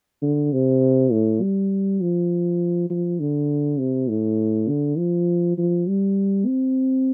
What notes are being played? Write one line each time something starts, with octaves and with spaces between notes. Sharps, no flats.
D3
C3
A2
G3
F3
F3
D3
C3
A2
D3
F3
F3
G3
C4